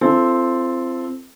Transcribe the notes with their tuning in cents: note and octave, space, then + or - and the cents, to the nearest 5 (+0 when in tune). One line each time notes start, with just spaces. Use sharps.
C4 +0 F4 -40 A4 +0